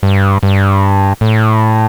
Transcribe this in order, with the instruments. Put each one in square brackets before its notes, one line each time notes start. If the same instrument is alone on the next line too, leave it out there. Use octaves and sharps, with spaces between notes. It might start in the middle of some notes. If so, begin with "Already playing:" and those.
[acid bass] G2
G2
A2